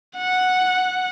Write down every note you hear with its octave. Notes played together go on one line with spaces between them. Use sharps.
F#5